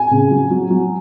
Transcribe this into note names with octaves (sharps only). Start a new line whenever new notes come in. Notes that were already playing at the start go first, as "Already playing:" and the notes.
Already playing: G#5
C#3
F#3
F#3
F#3